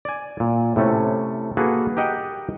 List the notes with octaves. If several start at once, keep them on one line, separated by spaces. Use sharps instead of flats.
D5 G#5
A#2
A2 C3 A3 C#4
A#3 F#4 G#4 A4 B4
G4 A#4 D#5 F#5 G5